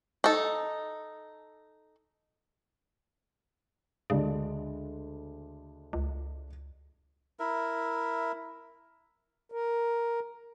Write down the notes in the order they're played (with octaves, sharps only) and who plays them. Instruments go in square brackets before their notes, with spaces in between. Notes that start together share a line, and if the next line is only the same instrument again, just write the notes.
[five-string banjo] D#4 A4
[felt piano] D2 G#3 D4 [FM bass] C#3
[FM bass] C#2
[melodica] E4 A#4 E5
[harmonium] A#4